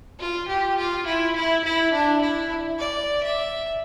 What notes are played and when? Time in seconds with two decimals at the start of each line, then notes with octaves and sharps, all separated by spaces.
0.19 F4
0.48 G4
0.77 F4
1.06 E4
1.35 E4
1.64 E4
1.92 D4
2.21 E4
2.78 D5
3.23 E5